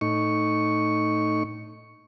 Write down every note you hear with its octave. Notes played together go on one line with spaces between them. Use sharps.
A2 D#4 C#6